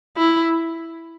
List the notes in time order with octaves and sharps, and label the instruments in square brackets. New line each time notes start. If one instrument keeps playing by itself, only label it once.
[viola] E4